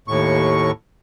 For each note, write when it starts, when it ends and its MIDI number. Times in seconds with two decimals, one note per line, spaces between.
0.08 0.71 39
0.08 0.71 45
0.08 0.71 85